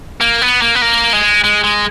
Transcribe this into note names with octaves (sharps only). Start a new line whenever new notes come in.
A#3
B3
A#3
B3
A#3
G#3
G#3
G#3